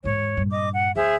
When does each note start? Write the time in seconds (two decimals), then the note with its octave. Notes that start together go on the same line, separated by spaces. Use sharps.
0.04 E2 G#2 C#5
0.37 G2 A#2
0.50 D#5 D6
0.73 F#5
0.95 D2 G#4 C5 E5